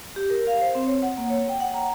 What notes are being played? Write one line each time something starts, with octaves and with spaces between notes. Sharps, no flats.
G4
A#4
F5
C5
C4
C#5
F#5
A#3
C#5
G5
F#5
A#5